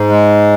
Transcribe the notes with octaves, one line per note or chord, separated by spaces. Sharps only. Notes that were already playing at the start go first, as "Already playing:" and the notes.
Already playing: G#2
G#3